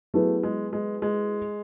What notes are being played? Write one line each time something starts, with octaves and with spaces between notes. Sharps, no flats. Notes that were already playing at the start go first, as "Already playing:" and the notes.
F#3 A3 B3 E4 G#4 B4
G#3
G#3
G#3